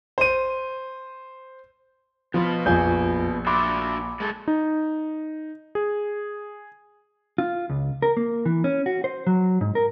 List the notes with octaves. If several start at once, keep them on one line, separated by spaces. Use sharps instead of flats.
C5 D#7
B2 F3 B3 F4
A#1 F2 F4 G#5 G6
D4 F#4 E5 B5 C6 D6
G#3 A4
D#4
G#4
F4
C#2
A#4
A#3
E3
C#4
F#4
C5
F#3
G#2
A#4